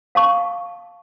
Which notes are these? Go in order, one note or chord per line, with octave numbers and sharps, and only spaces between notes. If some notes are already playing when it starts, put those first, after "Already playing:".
F5 A5 C#6